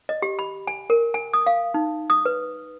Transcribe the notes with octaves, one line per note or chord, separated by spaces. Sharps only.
D#5
G4
B5
G#5
A#4
G#5
D#6
F5
D#4
D#6
B4